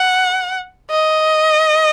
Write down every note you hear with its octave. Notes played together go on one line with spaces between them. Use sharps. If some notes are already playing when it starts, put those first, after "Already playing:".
Already playing: F#5
D#5